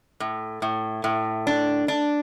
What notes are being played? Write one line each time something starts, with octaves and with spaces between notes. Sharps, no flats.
A2
A2
A2
D4
D4